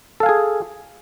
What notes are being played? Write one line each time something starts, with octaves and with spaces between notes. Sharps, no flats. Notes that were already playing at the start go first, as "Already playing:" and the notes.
G#4 A4 F5 G#5